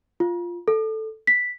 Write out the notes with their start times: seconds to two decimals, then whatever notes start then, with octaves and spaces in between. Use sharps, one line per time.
0.20 F4
0.68 A4
1.27 B6